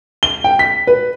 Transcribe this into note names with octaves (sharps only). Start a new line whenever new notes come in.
G7
G5
B6
B4